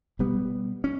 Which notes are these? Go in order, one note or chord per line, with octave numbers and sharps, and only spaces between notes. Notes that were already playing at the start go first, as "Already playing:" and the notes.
B2 G3 B3
C#4